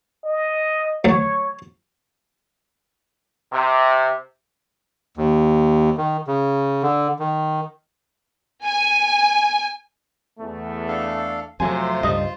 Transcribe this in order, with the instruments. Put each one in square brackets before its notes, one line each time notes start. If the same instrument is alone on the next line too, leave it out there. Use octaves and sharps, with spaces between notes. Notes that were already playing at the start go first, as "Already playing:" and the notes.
[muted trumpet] D#5
[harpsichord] D2 F#3 [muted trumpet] C#5
[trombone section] C3
[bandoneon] D#2
D#3
C#3
D3
D#3
[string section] G#5
[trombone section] E2 A3
[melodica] D4 A4 F5
[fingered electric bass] F2 F#3 [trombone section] C3 A3 [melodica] F4 C5 [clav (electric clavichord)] G#5
[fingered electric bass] C#2 G2 G3 [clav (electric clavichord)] D#5